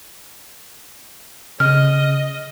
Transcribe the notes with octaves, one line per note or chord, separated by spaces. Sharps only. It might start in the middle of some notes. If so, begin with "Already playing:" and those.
C#3 D#5 F6